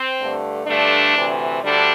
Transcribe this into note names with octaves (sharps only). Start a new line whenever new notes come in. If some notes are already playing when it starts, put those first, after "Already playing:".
Already playing: C4
G2 D3 A3
G2 D3 A3 D4
D2 C3 E3
D2 D3 G3 D4